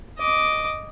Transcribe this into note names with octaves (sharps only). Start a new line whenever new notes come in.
D#5 D6